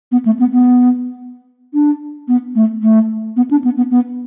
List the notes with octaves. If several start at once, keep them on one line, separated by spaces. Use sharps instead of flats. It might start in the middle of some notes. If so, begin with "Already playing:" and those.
B3
A3
B3
B3
D4
B3
A3
A3
B3
D4
B3
B3
B3